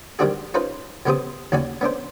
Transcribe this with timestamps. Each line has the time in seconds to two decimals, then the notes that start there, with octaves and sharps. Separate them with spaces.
0.19 D#3 G3 C4 D4 F#4 G#4
0.54 C#4 D#4 F4 B4 C5
1.06 F2 C#3 B3 G4 C5 D#6
1.52 D#2 C#3 F#4 D5 G#5
1.81 B3 C#4 D4 C5